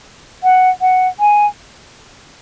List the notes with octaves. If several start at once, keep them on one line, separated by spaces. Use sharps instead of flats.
F#5
F#5
G#5